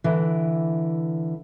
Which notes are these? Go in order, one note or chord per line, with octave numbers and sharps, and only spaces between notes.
D3 E3